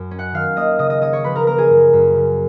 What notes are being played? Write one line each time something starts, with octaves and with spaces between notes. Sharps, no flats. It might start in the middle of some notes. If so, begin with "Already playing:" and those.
Already playing: F#2
C#4
F#5 F#6
D#3 F5 F6
A#3 D#5 D#6
C#3 D#5 D#6
D#5 D#6
C#4 D#5 D#6
C#5 C#6
F3 B4 B5
A#4 A#5
A#3 A#4 A#5
G#4 G#5
F#2
F#2
C#3